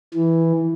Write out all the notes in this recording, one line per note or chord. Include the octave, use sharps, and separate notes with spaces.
E3